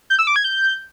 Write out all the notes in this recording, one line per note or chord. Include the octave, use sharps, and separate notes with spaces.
G6
E6
D6
G#6
G6